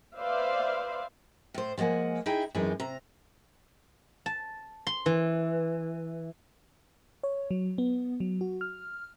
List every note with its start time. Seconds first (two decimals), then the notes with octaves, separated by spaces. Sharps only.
0.16 B4 C5 D5 E5 F5
1.54 A2 C5
1.78 F3 G#3 A#3 F#5 G#5
2.26 D#4 E4 G#4 E5 G5
2.55 F#2 E3 G#3 C4 D#4
2.80 C3 A#5
4.26 A5
4.87 C6
5.06 E3
7.23 C#5
7.51 F#3
7.78 B3
8.20 F#3
8.41 F#4
8.61 F6